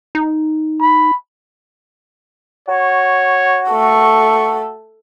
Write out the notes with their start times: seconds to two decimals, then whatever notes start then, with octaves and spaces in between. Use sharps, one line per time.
0.15 D#4
0.81 B5
2.68 F#4 C#5
3.70 A3 A4 C#6